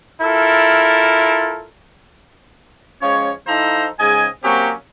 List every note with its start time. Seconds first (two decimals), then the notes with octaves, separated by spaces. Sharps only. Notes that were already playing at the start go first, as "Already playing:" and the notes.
0.22 E4 F4 A4 A#4
3.02 F3 G#3 C#4 C#5
3.47 F3 D#4 E4 A4 C5 A#5
4.00 G#2 C#3 G#3 D#5 G#5
4.43 F#3 A#3 C4 C#4 F#4 G4